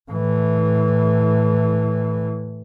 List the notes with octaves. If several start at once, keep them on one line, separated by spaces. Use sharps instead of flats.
A2 E3